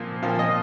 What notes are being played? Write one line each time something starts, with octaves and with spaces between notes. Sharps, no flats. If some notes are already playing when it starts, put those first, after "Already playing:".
Already playing: A#2 F3 A#3
A#2 F3 A#3 F5
D#5